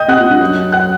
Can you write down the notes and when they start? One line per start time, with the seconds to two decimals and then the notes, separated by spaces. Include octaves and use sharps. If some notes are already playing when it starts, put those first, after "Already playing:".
Already playing: D#5 G5 D#6 G6
0.08 C3 F#5 F#6
0.20 A#2
0.30 G2
0.41 F#2
0.72 F#5 F#6